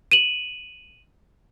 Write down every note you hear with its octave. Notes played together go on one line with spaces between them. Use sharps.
D#7 E7 F#7